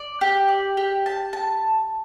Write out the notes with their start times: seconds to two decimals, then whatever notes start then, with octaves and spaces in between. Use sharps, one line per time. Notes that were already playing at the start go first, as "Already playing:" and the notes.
Already playing: D5
0.21 G4
0.49 D5
0.77 G4
1.06 A5
1.33 A5